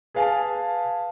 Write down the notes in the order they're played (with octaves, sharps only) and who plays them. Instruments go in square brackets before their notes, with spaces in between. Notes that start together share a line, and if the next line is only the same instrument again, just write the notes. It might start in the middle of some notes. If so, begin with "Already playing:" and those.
[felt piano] G#4 B4 F5 G#5 A5